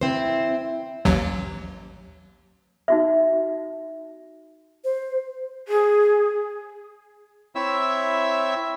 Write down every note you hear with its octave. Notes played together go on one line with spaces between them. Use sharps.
C4 E4 C5
A1 D#2 F#3
D#4 F#4 E5
C5
G#4
C4 E4 C#5 E5 E6